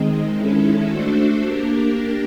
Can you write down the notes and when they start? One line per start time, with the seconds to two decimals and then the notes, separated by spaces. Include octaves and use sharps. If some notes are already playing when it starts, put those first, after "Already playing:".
Already playing: D#3 G#3 C4 D#4
0.33 D#3 G#3 C#4 E4 A4
0.88 A3 D4 F#4 A4 C5
1.42 A#3 D4 G4 A#4